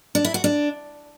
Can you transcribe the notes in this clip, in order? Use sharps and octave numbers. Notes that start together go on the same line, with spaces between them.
D4
E4
F#4
D4